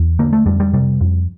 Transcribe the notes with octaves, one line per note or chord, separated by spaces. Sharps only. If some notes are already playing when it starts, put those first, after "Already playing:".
Already playing: E2
D3 A#3
A3
F2 G3
G3
C3 G3
F2